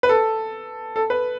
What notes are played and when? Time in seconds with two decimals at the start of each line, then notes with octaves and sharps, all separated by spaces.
0.03 B4
0.09 A4
0.96 A4
1.10 B4